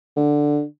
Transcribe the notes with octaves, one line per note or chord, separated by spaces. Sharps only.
D3